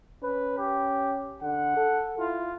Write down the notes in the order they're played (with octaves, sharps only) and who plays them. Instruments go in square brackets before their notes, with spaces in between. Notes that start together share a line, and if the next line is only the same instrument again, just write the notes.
[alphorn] C#4 [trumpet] B4
[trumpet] G4
[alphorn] D3 [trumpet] F#5
[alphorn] A4
[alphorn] E4 [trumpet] F4